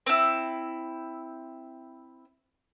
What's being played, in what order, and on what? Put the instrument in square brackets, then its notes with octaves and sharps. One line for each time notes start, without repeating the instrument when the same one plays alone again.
[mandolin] C4 E4